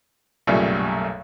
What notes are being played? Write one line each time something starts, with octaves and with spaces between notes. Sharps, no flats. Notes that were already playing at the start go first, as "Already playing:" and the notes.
B1 F#2 A#2 C#3 G3 A3